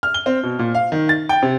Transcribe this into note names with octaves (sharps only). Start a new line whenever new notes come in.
F6
G7
C4
B2
A#2
F5
D#3
A6
G5
C3